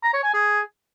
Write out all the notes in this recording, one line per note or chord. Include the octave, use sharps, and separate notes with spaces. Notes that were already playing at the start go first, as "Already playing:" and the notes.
A#5
C#5
G#5
G#4